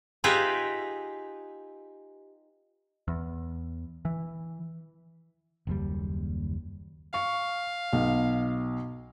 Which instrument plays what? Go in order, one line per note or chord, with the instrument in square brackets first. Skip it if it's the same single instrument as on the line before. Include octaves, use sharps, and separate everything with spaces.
[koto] D#4 F4 G4 G#4 B4 E5
[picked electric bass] E2
E3
[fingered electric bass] F#1 D#2 G3
[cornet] F5 [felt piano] C#6
[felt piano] B1